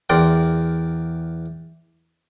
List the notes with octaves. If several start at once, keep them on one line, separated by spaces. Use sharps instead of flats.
E2 A#4 D5 G5 C6